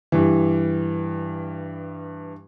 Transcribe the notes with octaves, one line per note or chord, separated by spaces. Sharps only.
G2 E3